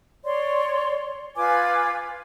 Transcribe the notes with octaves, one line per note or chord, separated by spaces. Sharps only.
C#5 D5 C6
F4 B4 G#5 D6